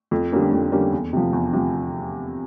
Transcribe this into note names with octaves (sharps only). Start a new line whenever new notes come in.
F2
D3 G3 A#3 C#4
F2
D3 G3 A#3 C#4
E2
C3 F3
E2
C3 F3